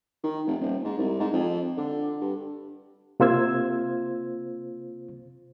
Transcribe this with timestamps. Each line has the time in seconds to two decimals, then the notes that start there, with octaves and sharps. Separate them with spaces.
0.24 D#3
0.46 F1
0.61 D#1
0.84 G#2
0.98 C2
1.19 G#2
1.33 F2
1.77 D3
2.21 G2
3.20 C3 A#3 F4 C5 E6 G#6